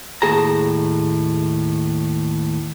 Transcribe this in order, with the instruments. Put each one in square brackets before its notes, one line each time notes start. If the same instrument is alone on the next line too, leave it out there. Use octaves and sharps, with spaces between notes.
[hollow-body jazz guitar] D#2 A2 G#4 A5 A#5